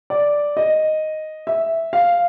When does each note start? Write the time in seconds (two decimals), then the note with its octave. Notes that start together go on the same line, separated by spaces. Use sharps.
0.10 D5
0.57 D#5
1.47 E5
1.93 F5